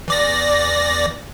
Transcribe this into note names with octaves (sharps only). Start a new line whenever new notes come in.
E2 D5 A#6